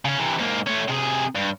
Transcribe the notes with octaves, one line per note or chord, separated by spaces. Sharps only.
C#3 C#4
C3 E3
G#2 A#3
A3 C#4
C3 G#4
G2